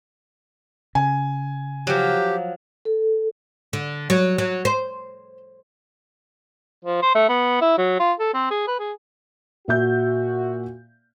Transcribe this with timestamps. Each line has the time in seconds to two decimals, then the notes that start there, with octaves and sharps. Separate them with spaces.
0.95 C#3 G#5
1.87 F3 F#3 G4
2.85 A4
3.73 D3
4.10 F#3
4.38 F#3
4.65 C5
6.85 F3
7.02 C5
7.15 A3
7.29 B3
7.61 E4
7.78 F#3
8.00 F4
8.20 A4
8.34 C4
8.51 G#4
8.68 B4
8.79 G#4
9.68 A#2 F#4 E5 G6